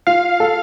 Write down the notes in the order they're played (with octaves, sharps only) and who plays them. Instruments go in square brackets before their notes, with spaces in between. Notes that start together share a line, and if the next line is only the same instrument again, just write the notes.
[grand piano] F4 [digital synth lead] F5
[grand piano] A4